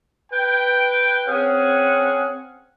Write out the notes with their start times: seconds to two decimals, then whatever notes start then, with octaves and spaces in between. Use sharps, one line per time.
0.33 B4 G5
1.28 C4 C#4 G#4 F#5